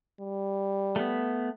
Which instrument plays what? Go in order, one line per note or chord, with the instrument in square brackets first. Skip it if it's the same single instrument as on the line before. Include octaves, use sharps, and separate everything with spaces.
[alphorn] G3
[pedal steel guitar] A3 B3